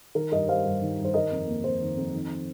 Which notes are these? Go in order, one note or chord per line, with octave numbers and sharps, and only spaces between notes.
D#3 A#4
G2 A#4 D#5
G3 C5 F5
G2
D#3
G2
C5
D#3 A#4 D#5
F2
A#3
F2 C5
D#3
F2
D#3